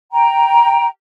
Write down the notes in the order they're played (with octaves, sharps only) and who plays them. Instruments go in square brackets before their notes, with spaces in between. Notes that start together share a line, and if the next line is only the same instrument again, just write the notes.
[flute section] G5 A#5